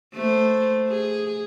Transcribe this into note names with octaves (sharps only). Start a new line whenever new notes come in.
A3 C5
G#4